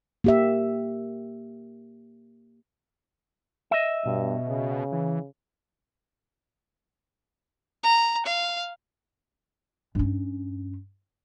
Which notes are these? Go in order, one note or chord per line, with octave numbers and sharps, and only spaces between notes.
A#3 G4 E5
D#5 E5
G2 B2
C#3
E3
A#5
F5
G2 C#4